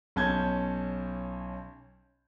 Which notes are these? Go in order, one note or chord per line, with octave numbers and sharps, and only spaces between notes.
B1 C#4 A5 G6 G#6